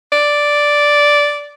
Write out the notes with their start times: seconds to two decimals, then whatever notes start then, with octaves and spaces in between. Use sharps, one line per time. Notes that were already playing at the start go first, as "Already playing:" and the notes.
0.12 D5